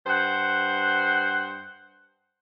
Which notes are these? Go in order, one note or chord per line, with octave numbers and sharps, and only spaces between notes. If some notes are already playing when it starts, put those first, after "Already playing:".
G2 C5 F#5